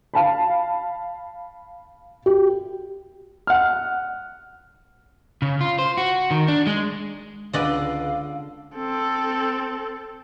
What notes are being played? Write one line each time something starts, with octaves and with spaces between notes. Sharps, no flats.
F5 A5 B5
G4
F#5 F6
C#3
F4
C5
F#4
D#3
D4
G#3
C#2 D3 B4 D5 D#5 F5
C4 A4